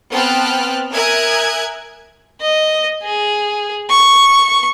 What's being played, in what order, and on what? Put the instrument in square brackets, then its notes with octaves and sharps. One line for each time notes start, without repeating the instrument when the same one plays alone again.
[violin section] B3 C4 G5 A5 F6 F#6
A#4 E5 G#5 D#6 F#6 G#6
[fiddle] D#5
G#4
C#6